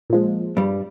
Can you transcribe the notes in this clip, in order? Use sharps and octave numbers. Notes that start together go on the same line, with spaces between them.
A#2 F3 G#3
G2 G3